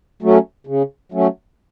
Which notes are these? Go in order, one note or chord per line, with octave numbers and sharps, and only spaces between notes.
F#3 A3 C#4
C#3
F#3 A3 C#4